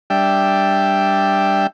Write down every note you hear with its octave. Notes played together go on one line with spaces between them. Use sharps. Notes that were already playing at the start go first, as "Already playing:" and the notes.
G3 D4 E5 G5